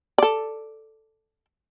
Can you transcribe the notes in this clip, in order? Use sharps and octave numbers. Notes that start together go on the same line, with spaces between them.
A4 D5